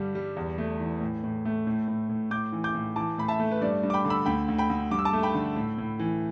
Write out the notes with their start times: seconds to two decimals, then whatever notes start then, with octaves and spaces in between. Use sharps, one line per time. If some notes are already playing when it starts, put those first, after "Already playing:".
Already playing: G2 D3 G3
0.15 G3
0.36 E2
0.58 A3
0.80 E3
1.01 A2
1.24 A2
1.45 A3
1.67 A2
1.88 A2
2.09 A2
2.31 A2 D6 G6
2.52 E3
2.64 D6 G6
2.75 A2
2.96 E3 A5 D6
3.18 A2 B5
3.28 E5 A5
3.40 A3
3.51 B4
3.61 G2 D5
3.83 G2
3.90 D6
3.94 G5 B5
4.05 D3
4.10 B5 E6
4.26 D2 G5 B5
4.48 D2
4.58 G5 B5
4.70 D2
4.91 G2 D6
4.99 E6
5.05 A5 D6
5.13 A3
5.23 G5 B5
5.35 D3
5.56 A2
5.78 A2
5.99 E3